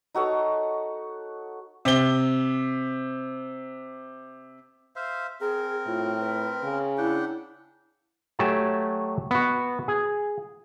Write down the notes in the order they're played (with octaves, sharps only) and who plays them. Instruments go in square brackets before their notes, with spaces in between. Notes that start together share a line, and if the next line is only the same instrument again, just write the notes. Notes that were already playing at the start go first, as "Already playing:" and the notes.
[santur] D#4 F#4 A4 C#5
[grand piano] C3 G7
[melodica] C5 E5 F5
[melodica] C4 A#4 [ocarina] G#4
[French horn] A2 [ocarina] F4
[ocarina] B4
[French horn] C#3
[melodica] D4 F#5 G5 [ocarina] E4
[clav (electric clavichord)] F#3 A3 G4 G#5 A5
B3 F#4
G#4